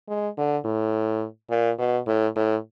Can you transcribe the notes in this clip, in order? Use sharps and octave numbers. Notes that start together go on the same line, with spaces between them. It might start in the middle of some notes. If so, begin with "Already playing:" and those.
G#3
D3
A2
A#2
B2
A2
A2